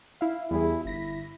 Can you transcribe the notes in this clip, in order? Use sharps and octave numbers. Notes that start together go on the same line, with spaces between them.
E4 E5 F5
E2 G3 E4 G#4
G1 E4 A#6 B6